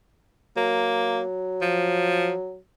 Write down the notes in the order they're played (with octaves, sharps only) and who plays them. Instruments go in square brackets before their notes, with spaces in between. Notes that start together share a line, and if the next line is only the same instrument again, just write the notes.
[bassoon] F#3 [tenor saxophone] A#3
[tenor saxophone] F3